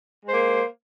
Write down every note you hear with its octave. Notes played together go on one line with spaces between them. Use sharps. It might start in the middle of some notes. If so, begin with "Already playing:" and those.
G#3 A#3 C5